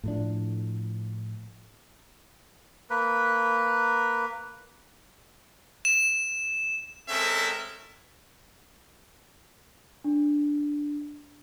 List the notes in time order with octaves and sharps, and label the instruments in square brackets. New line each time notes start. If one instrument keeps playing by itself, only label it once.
[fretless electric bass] A2 F3 D4
[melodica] A#3 B4
[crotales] E7
[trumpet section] G#3 C4 C#4 A4 A#4 E5
[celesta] D4